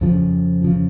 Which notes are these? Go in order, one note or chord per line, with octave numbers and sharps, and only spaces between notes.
F2 C#3 F3
C#3 F3